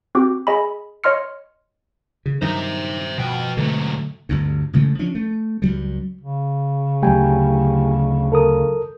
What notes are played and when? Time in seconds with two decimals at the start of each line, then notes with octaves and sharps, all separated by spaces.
0.15 C4 F#4 G4 D6
0.47 G#4 D#5 G#5 B5
1.04 C#5 D#5 C6 F6 C#7
2.26 C#3
2.42 G2 D#3 F#3 D#4 C5 E5
3.18 B2 F3 G5
3.57 G#2 D3 F#3 A3
4.29 G1 D2 G2
4.73 A1 C#3 G#3 A3
4.99 F3 C#4 D4
5.15 A3
5.62 C#2 G2 F#3 G3
6.21 C#3
7.03 D2 F#3 A3 G4 G5 G#5
8.32 A4 A#4 D#6